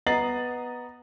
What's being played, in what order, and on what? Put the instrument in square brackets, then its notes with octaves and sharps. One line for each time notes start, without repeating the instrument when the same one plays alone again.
[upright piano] B3 D#5 A#5 A6 C7 F#7